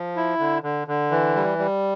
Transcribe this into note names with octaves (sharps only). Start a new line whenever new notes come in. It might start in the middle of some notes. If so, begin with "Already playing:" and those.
Already playing: F3
E4
D3
D3
D3
E3
G3
G3